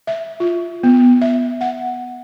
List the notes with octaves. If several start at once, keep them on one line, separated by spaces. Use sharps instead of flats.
E5
F4
B3
E5
F#5